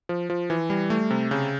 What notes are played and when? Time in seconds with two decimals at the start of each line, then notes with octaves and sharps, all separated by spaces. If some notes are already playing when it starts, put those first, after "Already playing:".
0.09 F3
0.30 F3
0.50 E3
0.70 G3
0.90 A3
1.10 C3
1.31 C#3